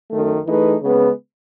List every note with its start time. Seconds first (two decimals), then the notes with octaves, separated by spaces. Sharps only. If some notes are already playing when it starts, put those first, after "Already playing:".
0.10 F#2 D#3 A3
0.46 E3 A3 D#4 G#4 B4
0.82 C#3 G#3 B3